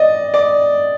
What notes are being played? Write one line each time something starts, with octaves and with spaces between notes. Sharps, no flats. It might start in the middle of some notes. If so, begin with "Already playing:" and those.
Already playing: D5 D#5
D5